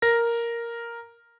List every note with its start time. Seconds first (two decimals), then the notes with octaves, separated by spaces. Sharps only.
0.02 A#4 A#6